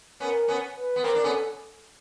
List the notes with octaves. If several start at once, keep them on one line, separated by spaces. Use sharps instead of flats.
B3 C#4 A#4
B3 C#4
B4
B3
A#3 C4 A#4
D4
B3 C#4 A4